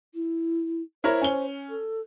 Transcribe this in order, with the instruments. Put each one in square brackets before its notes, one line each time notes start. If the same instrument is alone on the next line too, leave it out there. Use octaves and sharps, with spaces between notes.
[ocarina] E4
[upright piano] E4 A#4 C#5 [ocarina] C5
[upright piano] C#4 G7
[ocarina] A4